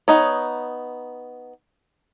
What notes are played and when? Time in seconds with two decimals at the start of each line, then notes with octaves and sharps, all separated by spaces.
0.08 B3 D#4 C#5